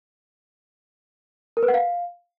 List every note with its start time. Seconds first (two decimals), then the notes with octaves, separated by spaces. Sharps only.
1.57 A#4
1.63 B4
1.68 F#5
1.74 F5